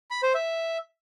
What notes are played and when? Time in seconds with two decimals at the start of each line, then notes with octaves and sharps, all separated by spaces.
0.11 B5
0.23 C5
0.35 E5